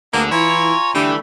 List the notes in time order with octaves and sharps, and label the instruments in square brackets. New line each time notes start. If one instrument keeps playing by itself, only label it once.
[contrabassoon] D2 [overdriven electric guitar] D3 [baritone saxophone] A#3 [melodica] B3 D4 G#4
[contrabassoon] E3 [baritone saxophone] E4 [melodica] F4 G#5 A#5 [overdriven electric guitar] C#5
[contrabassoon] D3 [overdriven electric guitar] E3 [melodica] G3 A3 A4 [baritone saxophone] G4